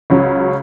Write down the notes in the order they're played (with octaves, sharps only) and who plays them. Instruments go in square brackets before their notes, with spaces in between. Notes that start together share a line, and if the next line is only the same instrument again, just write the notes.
[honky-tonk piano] C#2 C#3 F#3 C#4